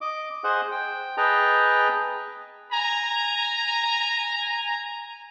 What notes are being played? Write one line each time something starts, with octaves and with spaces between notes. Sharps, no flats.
D#5 D6
G#4 C5 D#5 F#5
G5
G#4 B4 D#5 G5 A5 A#5
G#5 A#5